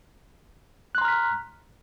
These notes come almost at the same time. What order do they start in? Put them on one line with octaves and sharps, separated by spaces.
F#6 C6 A#5 F6 B6